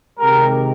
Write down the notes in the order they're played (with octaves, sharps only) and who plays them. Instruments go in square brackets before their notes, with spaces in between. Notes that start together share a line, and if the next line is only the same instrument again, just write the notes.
[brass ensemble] C3 D#3 G#3 G4 A#4